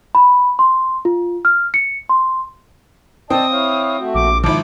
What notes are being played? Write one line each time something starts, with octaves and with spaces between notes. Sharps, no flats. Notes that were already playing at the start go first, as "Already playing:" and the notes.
B5
C6
F4
F6
C#7
C6
C4 D5 D#5 G5 A5 D#6
E4 C#5 F5
A3 F#4
A#1 D6
G#1 F3 E4 D6